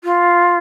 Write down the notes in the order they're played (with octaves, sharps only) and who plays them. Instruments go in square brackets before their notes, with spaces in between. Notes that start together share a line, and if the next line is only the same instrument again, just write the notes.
[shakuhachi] F4